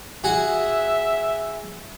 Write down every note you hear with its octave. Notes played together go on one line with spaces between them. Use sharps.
F#4 G#4 E5 F#5